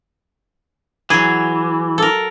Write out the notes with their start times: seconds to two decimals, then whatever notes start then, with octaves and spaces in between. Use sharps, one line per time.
1.10 E3 F#3 G#4
1.98 A4 A#4